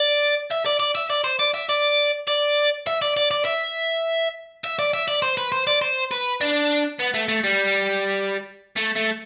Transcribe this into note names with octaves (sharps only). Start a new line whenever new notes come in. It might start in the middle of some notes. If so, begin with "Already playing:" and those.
Already playing: D5
E5
D5
D5
E5
D5
C5
D5
E5
D5
D5
E5
D5
D5
D5
E5
E5
D5
E5
D5
C5
B4
C5
D5
C5
B4
D4
B3
A3
A3
G3
A3
A3